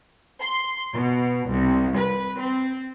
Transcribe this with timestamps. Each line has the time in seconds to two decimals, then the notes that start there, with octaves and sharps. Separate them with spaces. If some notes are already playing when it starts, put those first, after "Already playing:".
0.40 C6
0.94 B2
1.49 C2
1.98 B4
2.42 C4